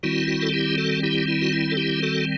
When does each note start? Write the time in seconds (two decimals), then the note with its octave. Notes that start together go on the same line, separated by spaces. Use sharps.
0.03 D#3 G3 C4 E4 F#4
0.28 F#4
0.42 A4
0.53 E4 G4
0.78 F#4 A4
1.03 E4 G4
1.28 E4
1.42 F#4
1.53 E4
1.71 A4
1.77 E4 G4
2.02 F#4 A4